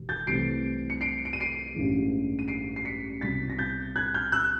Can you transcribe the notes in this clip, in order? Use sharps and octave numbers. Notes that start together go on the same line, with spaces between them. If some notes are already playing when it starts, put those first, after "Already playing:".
Already playing: E1 D#2
G6 A6
C2 C3 E3 A3 C4 C7 D7
C#7
C7 D7
D7
D#7
C7 D7
A1 G2 E3 G#3
D#7
C7 D7
C7
B6 C#7
C2 B2 G3 C4 A6 B6
A#6
G6 A6
F#6 G#6
F6 G6
E6 F#6